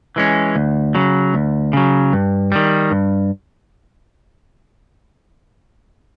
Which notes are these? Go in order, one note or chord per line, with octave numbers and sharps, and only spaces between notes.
E3 G#3 C#4
D2
C#3 F#3
D2
C#3 F#3
G2
D#3 G3
G2